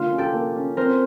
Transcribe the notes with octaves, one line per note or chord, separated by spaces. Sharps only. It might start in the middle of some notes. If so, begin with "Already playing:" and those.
Already playing: D3 A#3 F4
C#4
G4 A4
A#3
C#4
C4 A#4 C5